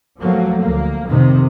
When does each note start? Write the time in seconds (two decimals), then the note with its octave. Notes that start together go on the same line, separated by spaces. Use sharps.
0.20 F3 F#3 A3 A#3
0.61 D2 A#3
1.08 F2 C3 D#3